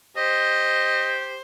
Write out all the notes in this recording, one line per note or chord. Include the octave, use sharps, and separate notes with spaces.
G4 C5 D#5